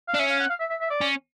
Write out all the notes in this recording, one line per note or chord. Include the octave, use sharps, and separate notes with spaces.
F5
D4
C#4 E5
F5
F#5
F5
E5
E5
E5
D5
C#4